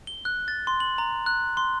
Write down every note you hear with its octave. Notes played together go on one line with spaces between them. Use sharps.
G7
F#6
A6
C6
F#7
A#5
F#6
C6